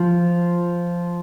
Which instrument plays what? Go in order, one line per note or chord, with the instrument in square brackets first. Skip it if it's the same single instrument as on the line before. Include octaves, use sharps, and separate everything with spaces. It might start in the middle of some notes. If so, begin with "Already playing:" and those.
Already playing: [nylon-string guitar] F3